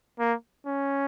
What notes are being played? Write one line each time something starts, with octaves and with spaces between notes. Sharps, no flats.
A#3
C#4